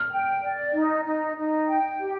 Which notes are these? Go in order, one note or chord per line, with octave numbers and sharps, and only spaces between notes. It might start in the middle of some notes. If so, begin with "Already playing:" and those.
Already playing: F6
G5
D5
D#4
D#4
D#4
G5
G4